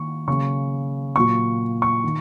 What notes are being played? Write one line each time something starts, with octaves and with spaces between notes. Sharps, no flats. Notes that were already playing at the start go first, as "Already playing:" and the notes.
Already playing: D#3 A#3 C#6
C#3 F#3 A#3 C#6
A#2 F#3 A#3 C#6
C#6
D#3